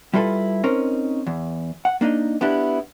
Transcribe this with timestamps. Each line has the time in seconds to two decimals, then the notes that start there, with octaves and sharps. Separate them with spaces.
0.13 G3 E4 F4 A4 B4
0.63 C4 C#4 D#4 A#4
1.27 E2
1.85 F#5
2.01 A#3 D4 D#4 D#5
2.41 B3 D4 E4 G4